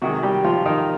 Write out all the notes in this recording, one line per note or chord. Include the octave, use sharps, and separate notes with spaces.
C3 D#3 F#3 G#3 F#4
G3 G4
F3 F4
D#3 D#4